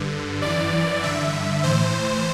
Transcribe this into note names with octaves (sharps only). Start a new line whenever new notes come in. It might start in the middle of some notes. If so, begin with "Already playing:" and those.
Already playing: G2 D3
F#2 E3 D5
G2 D3 E5
A2 E3 C5